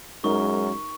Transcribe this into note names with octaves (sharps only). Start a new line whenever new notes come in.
F#2 G#3 D#4 A#4 C#6